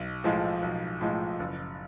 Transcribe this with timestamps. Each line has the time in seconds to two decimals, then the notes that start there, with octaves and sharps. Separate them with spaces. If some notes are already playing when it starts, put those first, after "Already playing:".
Already playing: B1
0.24 A2 F3 G#3
0.62 B1
1.01 A2 F3 G#3
1.40 F#1